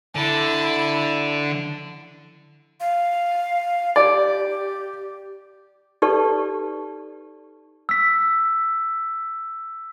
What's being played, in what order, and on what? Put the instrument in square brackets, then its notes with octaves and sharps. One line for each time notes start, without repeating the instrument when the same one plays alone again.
[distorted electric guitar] D3 [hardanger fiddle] E4 A5
[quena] F5
[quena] G4 [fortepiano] D5
[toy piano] D#4 G4 A4 B4 D5 C#6
[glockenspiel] E6 B6